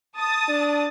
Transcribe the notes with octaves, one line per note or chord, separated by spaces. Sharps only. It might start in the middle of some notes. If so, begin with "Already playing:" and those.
A5 D#6 A6
D4